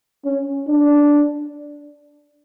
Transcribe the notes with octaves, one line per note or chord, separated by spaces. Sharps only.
C#4
D4